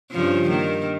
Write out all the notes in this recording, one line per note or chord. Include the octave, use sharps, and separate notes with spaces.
G2 C#3 F3
D#3 A#3